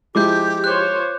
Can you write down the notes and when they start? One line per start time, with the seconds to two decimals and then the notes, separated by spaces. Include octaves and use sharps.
0.15 F3 G#3 E4 G4 D6 G6
0.64 F4 C5 C#5 F#6 G6